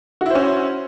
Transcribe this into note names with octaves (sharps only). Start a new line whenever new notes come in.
C#4 E4 F#4 C5